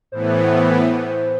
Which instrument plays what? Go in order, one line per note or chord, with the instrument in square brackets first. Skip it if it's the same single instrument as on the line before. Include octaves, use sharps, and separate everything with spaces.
[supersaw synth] A2 E3 B3 [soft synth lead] C5
[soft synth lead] C5